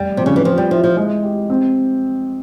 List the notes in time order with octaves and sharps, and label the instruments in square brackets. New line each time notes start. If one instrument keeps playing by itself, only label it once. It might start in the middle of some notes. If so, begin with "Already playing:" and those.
Already playing: [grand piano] F1 [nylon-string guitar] G3
[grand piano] F2 [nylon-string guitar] C3
[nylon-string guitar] C#3
E3
[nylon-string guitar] F3 [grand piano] G4
[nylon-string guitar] G3
[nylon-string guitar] F3 [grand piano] E4
[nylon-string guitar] F3
[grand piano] G#3
G4
C4